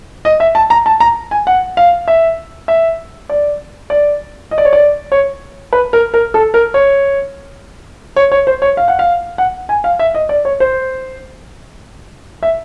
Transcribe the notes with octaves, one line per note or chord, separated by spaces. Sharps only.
D#5
E5
A5
A#5
A5
A#5
G#5
F#5
F5
E5
E5
D5
D5
D#5
D5
C#5
D5
C#5
B4
A#4
A#4
A4
A#4
C#5
C#5
C#5
C5
C#5
F5
F#5
F5
F#5
G#5
F5
E5
D#5
D5
C#5
C5
E5